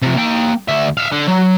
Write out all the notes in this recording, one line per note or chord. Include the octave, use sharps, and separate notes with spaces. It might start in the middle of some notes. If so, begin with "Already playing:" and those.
C3 F3
A#3 G5
D2 E5
E5 F5
D3
F#3